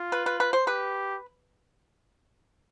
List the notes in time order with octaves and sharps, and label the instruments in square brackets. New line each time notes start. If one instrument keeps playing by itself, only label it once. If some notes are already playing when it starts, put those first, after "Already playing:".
Already playing: [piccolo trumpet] F4
[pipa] B4
B4
B4
C5
[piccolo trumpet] G4 [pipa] B4